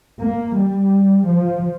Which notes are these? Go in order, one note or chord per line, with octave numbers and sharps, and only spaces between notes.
A#3
G3
F3